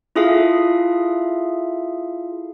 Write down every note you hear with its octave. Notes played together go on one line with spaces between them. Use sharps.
E4 F4 G#4 A4 E5 F5